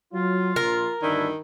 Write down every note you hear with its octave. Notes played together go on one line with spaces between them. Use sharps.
F#3 F4
A#1 A#4
G1 D2 D#3 D4 E4